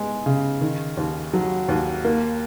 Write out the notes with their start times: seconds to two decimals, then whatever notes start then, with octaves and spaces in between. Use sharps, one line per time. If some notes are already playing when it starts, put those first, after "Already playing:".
Already playing: G#3 B3
0.26 C#3
0.61 D#3
0.97 D#2
1.33 F#3
1.69 D#2
2.05 A#3